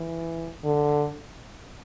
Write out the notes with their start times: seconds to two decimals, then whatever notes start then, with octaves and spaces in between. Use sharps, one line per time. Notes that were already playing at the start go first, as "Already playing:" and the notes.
Already playing: E3
0.64 D3